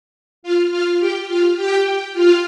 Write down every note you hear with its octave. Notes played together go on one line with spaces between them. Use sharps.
F4 F5
F4 F5
G4 G5
F4 F5
G4 G5
F4 F5